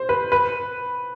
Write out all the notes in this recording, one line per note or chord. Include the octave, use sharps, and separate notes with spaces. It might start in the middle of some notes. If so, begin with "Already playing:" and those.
Already playing: C5
B4
B4